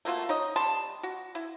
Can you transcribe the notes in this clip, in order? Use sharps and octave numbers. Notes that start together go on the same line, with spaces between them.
A3 A#3 F4 F#4
D#4 C#5 D#5
G3 A5 C6
F#4
E4